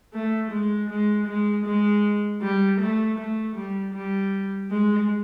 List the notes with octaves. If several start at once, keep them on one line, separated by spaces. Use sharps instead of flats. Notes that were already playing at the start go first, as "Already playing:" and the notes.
A3
G#3
G#3
G#3
G#3
G3
A3
A3
G3
G3
G#3